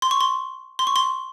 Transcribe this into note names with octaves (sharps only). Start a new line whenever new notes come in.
C6
C#6
C6
C6
C#6
C6